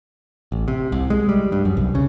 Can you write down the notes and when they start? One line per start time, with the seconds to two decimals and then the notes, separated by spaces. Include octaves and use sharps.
0.52 A1
0.68 C3
0.92 C2
1.10 G#3
1.29 G3
1.52 G2
1.65 F#2
1.77 C2
1.95 C#3